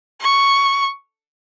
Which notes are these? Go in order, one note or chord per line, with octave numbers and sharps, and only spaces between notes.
C#6